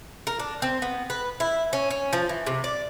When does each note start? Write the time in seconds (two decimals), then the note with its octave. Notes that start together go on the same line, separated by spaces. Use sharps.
0.27 A#4
0.40 D4
0.62 C4
0.82 B3
1.10 B4
1.40 E4
1.73 C#4
1.90 C#4
2.13 F3
2.29 E3
2.47 C3
2.64 D5